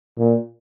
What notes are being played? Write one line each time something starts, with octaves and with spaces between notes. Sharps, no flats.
A#2